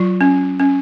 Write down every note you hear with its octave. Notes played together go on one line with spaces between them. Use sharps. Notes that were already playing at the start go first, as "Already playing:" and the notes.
Already playing: F#3 F4
C#4
C#4